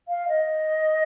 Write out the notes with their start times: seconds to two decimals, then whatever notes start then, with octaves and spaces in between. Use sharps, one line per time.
0.08 F5
0.29 D#5